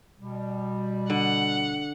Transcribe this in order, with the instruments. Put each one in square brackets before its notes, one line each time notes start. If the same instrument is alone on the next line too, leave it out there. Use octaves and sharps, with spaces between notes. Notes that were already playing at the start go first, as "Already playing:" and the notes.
[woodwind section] B2 G3
[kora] D3 [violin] F#5